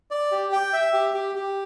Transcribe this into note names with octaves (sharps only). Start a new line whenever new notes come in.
D5
G4
G5
E5
G4
G4
G4